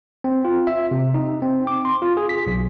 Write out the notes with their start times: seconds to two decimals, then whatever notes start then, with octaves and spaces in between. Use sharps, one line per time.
0.24 C4
0.45 F4
0.67 E5
0.91 C3
1.14 D#4
1.42 C4
1.67 D6
1.85 C6
2.02 F4
2.17 G#4
2.29 B6
2.47 B1